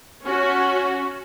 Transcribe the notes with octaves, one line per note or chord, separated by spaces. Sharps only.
C#4 F#4